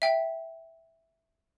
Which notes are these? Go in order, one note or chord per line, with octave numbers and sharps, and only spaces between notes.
E5 G5